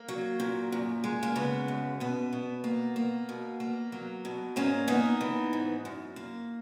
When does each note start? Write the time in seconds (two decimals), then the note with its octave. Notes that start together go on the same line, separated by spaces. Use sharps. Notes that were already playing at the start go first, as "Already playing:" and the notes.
Already playing: A#3
0.08 F#3
0.40 A#2
0.72 F#2
1.04 G#3
1.23 A#3
1.36 C#3 B3
1.68 F#2
2.00 B2 B3
2.33 B2
2.64 A#3
2.96 A#3
3.29 B2
3.60 A#3
3.92 F#3
4.25 B2
4.56 G#2 A#3 C#4
4.88 A#3 B3 D#4
5.21 E3
5.53 G#2
5.85 F#2
6.16 A#3